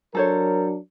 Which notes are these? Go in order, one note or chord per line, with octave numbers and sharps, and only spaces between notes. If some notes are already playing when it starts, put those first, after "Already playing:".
F#3 D4 A4 A#4 C5 C#5